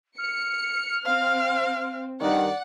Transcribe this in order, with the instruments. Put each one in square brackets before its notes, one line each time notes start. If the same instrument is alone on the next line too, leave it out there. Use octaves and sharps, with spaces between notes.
[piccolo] F6 [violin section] C#7
[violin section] C4 [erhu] F5
[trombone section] G2 D#3 [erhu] D5 [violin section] F#5